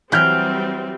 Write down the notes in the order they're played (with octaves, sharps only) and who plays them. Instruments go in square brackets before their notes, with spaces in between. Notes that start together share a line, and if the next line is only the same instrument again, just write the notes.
[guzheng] E3 F#3 [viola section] G3 C4 [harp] F6 G6 D7